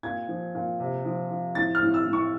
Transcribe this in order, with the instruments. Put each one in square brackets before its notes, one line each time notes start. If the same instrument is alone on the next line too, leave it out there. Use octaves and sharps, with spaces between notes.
[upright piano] A#2 G#6
F3
A#2
C3
F3
F3
A2 A6
F6
A2
E6
A2
C#6